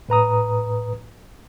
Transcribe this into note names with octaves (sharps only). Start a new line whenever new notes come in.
A2 B4 A#5 D#6